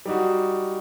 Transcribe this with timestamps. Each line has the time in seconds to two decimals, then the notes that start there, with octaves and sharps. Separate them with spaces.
0.06 G3 D#4 F#4